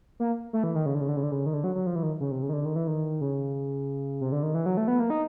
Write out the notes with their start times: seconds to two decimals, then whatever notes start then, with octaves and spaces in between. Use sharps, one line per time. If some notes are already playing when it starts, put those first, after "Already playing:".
0.20 A#3
0.53 A3
0.63 E3
0.75 D#3
0.86 C#3
0.94 D3
1.01 C#3
1.08 D3
1.17 C#3
1.23 D3
1.32 C#3
1.46 D#3
1.54 D3
1.64 F#3
1.75 F#3
1.86 F3
1.96 E3
2.03 D#3
2.20 C#3
2.32 C3
2.42 C#3
2.49 D#3
2.53 D3
2.65 D#3
2.76 E3
2.87 D#3
3.21 C#3
4.21 C3
4.32 D3
4.43 D#3
4.54 E3
4.66 F#3
4.77 A3
4.88 B3
5.00 A#3
5.10 D#4